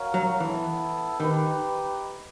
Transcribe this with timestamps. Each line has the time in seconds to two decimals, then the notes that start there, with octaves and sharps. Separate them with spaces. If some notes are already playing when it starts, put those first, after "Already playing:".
Already playing: F#4 A#4 C#5 F5
0.14 F#3
0.40 E3 B3 E4 A4
1.20 D#3 D#4 G4 B4